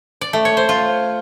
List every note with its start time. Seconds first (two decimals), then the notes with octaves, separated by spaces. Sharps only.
0.21 D5
0.33 A3
0.45 C#5
0.57 C5
0.69 F4